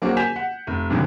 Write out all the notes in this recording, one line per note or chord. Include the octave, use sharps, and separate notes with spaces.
F#3 A#3 C4 D4 F#4 G#4
G#5 G6 B6 E7 F7
F#5
F1
G#1 G#2 B2 D3 D#3 F#3